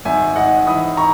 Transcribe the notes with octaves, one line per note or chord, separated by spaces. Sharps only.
G#1 E5 G#5
G#2 D#5 F#5
E3 B5 D#6
A#5 C#6